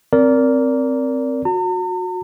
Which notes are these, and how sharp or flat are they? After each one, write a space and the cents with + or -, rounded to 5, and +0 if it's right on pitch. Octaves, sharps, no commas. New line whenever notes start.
C4 +0 A#4 +0 D5 -25
F#4 -25 A#5 -45